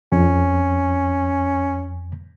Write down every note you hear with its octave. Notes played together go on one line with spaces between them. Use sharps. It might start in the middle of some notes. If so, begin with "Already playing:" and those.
F2 C#4